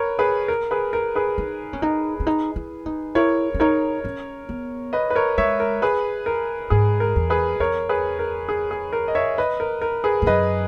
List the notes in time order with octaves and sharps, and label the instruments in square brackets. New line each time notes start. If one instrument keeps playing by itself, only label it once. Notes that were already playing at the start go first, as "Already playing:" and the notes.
Already playing: [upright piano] A#4 B4 C#5
G#4 B4
A#4
G#4 B4
A#4
G#4 B4
[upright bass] D#4
C#4
D#4
C#4
D#4
E4
D#4
[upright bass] E4 [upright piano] A#4 C#5
[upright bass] C#4
[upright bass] D#4 [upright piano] A#4 C#5
[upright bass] C#4
B3
[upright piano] B4 D#5
B4
A#4 C#5
[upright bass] G#3 [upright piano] C#5 E5
[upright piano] A#4
G#4 B4
A#4
[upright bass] G#2 [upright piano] G#4
[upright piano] A#4
[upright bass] E2
[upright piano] G#4 B4
[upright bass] E2 [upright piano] A#4 C#5
[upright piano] G#4 B4
A#4
G#4
G#4
A#4
D#5
C#5 E5
B4 D#5
A#4
A#4
G#4 B4
[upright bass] G#2
[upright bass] F#2 [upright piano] B4 D#5